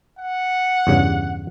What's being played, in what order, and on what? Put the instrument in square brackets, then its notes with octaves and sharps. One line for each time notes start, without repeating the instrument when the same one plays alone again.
[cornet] F#5
[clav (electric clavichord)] E2 G2 C#3